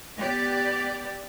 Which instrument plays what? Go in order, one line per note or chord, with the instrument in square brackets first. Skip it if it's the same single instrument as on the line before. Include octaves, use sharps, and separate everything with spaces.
[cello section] B3 G4 D5